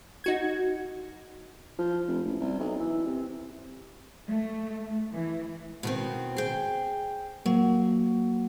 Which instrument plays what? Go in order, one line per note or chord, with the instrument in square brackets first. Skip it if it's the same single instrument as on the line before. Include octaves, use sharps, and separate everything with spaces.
[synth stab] D#4 F#4 G#6
[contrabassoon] F3
F1
A1
C2
B1
E3
C3
[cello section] A3
E3
[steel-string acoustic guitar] B2 D#3 C4
G#4 G5
[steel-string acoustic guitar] F#3 [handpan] A#3